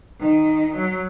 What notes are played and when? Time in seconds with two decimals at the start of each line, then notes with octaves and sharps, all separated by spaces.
0.19 D#3
0.76 F#3